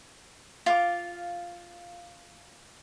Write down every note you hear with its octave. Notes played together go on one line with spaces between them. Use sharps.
F4 F5 D6